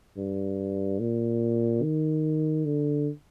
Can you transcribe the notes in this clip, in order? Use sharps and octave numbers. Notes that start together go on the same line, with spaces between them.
G2
A#2
D#3
D3